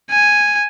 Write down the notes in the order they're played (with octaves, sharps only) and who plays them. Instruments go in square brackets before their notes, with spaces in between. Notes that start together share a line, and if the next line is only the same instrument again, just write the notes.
[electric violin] G#5